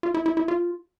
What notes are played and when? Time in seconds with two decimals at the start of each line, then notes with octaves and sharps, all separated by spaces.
0.03 F4
0.14 E4
0.26 E4
0.37 E4
0.48 F4